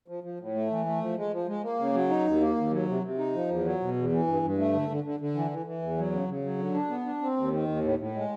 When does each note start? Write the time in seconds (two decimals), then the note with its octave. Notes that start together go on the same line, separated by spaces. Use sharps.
0.08 F3
0.24 F3
0.40 A2
0.55 A3
0.70 E3
0.86 A3
1.01 F3
1.18 G#3
1.33 F3
1.48 G#3
1.63 A#3
1.79 C#3
1.94 F#3
2.10 D#4
2.26 D#2
2.41 A#3
2.56 D#2
2.71 F#3
2.88 C3
3.03 C3
3.18 D#4
3.34 F3
3.49 E2
3.65 F#3
3.80 B2
3.96 E2
4.12 E3
4.27 G2
4.42 G2
4.58 A3
4.74 D3
4.89 D3
5.04 D3
5.20 D3
5.35 E3
5.51 E3
5.66 E3
5.82 E2
5.97 F#3
6.12 C#3
6.28 C#3
6.44 F#3
6.59 D3
6.74 D4
6.90 B3
7.06 D4
7.22 C4
7.37 D#2
7.52 D#3
7.68 D#2
7.84 A2
7.99 A2
8.15 G#3